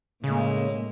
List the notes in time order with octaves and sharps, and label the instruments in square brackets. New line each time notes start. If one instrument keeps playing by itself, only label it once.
[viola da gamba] A2 G#3 A#3 [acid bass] C#3